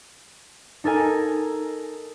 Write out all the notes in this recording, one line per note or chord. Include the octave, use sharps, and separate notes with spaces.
D#4 A4 A#4 G#5